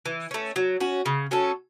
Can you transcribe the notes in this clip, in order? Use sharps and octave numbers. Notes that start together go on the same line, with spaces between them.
E3
A3 C#4
F#3
C#4 F#4
C#3
F#3 C#4 A4